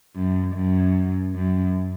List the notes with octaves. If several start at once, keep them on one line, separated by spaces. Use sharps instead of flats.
F#2
F#2
F#2